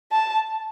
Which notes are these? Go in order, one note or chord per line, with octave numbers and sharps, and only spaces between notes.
A5